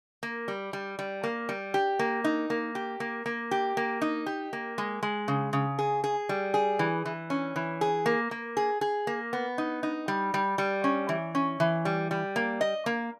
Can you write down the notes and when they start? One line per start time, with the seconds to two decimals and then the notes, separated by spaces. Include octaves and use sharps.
0.23 A#3
0.48 G3
0.73 G3
0.99 G3
1.24 A#3
1.49 G3
1.74 G4
1.99 A#3
2.24 D#4
2.50 A#3
2.75 G4
3.00 A#3
3.26 A#3
3.51 G4
3.77 A#3
4.01 D#4
4.26 G4
4.53 A#3
4.78 G#3
5.03 G#3
5.28 C#3
5.53 C#3
5.79 G#4
6.04 G#4
6.29 G3
6.54 G#4
6.79 E3
7.05 E3
7.30 C#4
7.56 E3
7.81 G#4
8.06 A#3
8.31 A#3
8.57 G#4
8.81 G#4
9.07 A#3
9.33 B3
9.58 D#4
9.83 D#4
10.08 G3
10.34 G3
10.58 G3
10.84 C#4
11.09 E3
11.35 C#4
11.60 E3
11.85 G3
12.11 G3
12.36 A#3
12.61 D#5
12.86 A#3